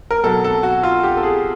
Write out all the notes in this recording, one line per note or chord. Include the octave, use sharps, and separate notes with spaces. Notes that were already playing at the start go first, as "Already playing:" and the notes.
A#4
B2 F#3 A4
A4
F#4
F4
G4
A4
G#4